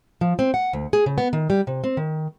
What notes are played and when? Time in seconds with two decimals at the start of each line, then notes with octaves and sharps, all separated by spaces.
0.21 F3
0.39 C4
0.54 F#5
0.73 D2
0.93 G#4
1.06 C#3
1.18 B3
1.33 D#3
1.50 G3
1.67 C3
1.84 C4
1.97 D#3